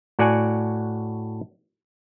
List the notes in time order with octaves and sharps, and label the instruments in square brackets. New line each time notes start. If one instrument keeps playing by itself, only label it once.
[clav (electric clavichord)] A2 F#4 D5 F#5 G#5